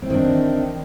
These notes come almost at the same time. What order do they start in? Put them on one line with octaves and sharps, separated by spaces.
C4 E4 D#3 D4